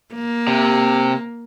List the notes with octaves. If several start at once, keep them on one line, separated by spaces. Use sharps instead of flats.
A#3
C3